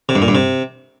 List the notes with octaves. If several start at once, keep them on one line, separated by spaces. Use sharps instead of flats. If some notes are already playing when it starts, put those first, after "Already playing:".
C3
G2
A#2
G2
C3